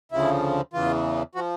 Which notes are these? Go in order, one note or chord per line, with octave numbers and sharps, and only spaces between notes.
D2 C#3 F3 E4
E2 C#3 E3 F4
F3 F#4